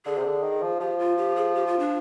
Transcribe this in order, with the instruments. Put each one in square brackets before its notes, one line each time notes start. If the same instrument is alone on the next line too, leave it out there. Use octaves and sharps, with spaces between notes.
[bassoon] D3 [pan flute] G#4
[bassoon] C3
D3
D#3
F3
[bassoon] F3 [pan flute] G4
[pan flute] F4
G4
G#4
G4
F4
D4